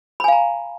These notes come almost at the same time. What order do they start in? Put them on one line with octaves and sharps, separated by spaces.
B5 G#5 F5 A#5